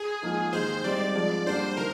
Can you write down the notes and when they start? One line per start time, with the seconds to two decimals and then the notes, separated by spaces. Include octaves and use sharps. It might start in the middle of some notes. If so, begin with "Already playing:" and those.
Already playing: G#4
0.22 G#2 F3 A#3 D#4
0.53 D#2 D#3 G#3 D#4 C5
0.84 G#2 G3 C4 D#4 G4 D5
1.15 G#2 F3 G#3
1.46 F2 D3 G3 A#3 D4 C5
1.77 D#3 A#4